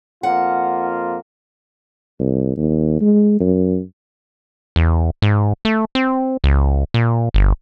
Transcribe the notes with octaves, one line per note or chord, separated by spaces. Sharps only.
F2 A#3 F4 F#5
C2
D#2
G#3
F#2
E2
G#2
A3
C4
C#2
A#2
G1